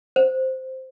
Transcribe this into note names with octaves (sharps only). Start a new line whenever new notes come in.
C5